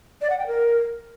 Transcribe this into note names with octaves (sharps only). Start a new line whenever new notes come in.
D5
F#5
G5
A#4